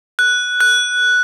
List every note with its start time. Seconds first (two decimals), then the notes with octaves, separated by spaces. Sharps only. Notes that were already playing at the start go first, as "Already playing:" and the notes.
0.19 F#6
0.61 F#6